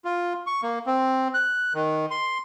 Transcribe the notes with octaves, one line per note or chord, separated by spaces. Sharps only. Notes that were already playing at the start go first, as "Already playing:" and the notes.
F4
C#6
A#3
C4
F#6
D#3
C6